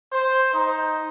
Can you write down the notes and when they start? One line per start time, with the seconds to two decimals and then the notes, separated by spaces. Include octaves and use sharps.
0.13 C5
0.54 D#4